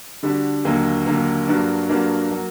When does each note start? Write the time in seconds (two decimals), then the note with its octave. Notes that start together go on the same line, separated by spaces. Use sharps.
0.23 D3 G3 D4 F#4
0.65 D#2 D3 F#3 A#3
1.06 D#2 D3 F#3 A#3
1.47 G2 F#3 A#3 D4 F#4
1.89 G2 F#3 A#3 D4 F#4
2.31 F#3 A#3 F#4